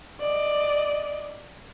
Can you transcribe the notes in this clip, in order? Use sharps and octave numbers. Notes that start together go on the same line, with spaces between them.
D5 D#5